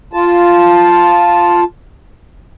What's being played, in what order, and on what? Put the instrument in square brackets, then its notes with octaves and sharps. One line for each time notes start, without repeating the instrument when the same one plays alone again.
[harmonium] F4 A5